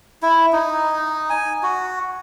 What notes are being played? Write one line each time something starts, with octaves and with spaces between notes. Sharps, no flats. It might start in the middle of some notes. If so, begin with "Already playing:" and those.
E4
D#4
G#5
F#4